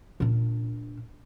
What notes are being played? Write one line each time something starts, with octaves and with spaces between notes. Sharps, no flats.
A#2 D4